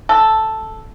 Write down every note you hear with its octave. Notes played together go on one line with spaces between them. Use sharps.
A4